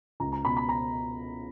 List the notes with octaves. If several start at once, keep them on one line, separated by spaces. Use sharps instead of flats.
C#2 A#5
A#5
B2 B5
B5
A#5